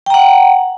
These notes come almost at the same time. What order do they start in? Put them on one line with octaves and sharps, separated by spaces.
G5 A#5 F#5